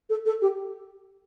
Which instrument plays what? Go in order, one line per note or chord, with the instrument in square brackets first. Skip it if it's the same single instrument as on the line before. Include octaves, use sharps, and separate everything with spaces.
[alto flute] A4
A4
G4